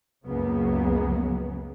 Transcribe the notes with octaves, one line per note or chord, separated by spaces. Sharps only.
C#2 F#2 C#3 F#3 A#3 B3